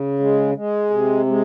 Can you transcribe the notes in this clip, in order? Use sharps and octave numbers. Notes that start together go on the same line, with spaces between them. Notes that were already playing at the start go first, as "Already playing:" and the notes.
Already playing: C#3
G#3
G#3
C3
G#3